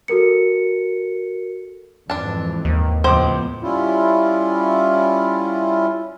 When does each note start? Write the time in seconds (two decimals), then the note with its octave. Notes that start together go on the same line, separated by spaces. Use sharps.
0.08 F#4 A4 A#4 C#7
2.10 F2 G#2 E3 D4 A5
2.65 D#2
3.04 C#2 A2 F3 B3 C5 D6
3.63 G3 C#4 E4 F4